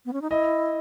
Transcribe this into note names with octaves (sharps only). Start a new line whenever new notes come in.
B3
C#4
D#4
E4 D#5